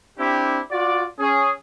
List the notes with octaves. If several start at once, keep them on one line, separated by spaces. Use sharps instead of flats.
C4 D4 E4 G4
F4 F#4 D5
C#4 G#4